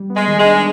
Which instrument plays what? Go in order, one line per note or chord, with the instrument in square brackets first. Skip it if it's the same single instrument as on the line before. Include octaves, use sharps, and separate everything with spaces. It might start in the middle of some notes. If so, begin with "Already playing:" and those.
Already playing: [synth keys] G3
B3
[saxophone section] G#3
[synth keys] D#3
[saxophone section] G#3
[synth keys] D4